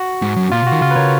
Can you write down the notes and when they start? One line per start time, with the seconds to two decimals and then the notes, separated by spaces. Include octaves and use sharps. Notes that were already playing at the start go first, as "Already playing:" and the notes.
Already playing: F#4
0.22 G#2
0.36 F#2
0.52 A#2 F4
0.62 B2
0.67 D#3 F#4
0.82 C#3 F4
0.91 B4
0.96 C#3 A#4 C#5